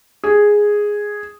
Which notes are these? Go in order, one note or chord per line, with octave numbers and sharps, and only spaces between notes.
G#4